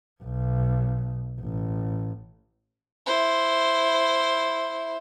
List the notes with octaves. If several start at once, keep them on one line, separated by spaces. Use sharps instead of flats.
B1
A1
E4 C5